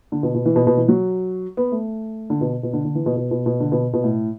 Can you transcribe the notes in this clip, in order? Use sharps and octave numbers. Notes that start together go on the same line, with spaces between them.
D3
B2
B2
E3
B2
B2
E3
F#3
B3
A3
D3
B2
B2
D3
D3
E3
B2
B2
B2
B2
D3
B2
B2
A2